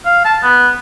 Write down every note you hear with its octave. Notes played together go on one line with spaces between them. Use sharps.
F5
A5
B3